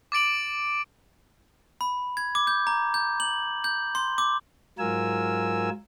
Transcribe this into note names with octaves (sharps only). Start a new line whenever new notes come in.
D6 A6 D7 F#7
B5
G#6
D6
G6
A#5
G6
F#7
G6
C6
D6
G#2 F#3 F4 A#4 G#5 E6